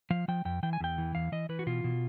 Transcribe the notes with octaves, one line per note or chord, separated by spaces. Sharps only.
F3 F5
F3 G5
F2 G5
E3 G5
G#5
E2 G5
E3
E2 F5
E3 D#5
E3 B4
F#4
B2 F4
B2